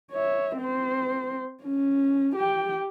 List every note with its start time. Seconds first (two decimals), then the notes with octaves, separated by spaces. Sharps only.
0.12 C#5 E5
0.57 C4 C5
1.63 C#4
2.36 G4 G5